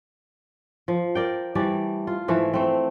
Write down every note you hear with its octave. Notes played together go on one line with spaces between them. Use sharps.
F3
A#4 D5 G5
E3 G3 A3 D5
F4
G#2 E3 F3 A3
A3 C4